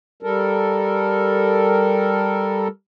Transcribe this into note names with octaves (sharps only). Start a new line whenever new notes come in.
G3 A4 A#4